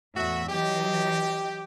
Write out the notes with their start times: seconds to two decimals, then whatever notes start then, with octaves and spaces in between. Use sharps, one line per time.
0.16 E2 A2 F#4 E5
0.49 E3 F#3 G4 D#5